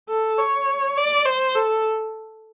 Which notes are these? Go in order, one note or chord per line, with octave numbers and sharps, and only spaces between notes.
A4
C#5
D5
C5
A4